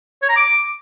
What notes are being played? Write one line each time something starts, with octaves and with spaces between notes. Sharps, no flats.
C#5
A#5
D6